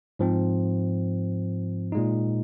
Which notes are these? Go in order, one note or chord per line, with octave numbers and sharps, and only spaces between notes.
G#2 F3 C4
A#2 G#3 D#4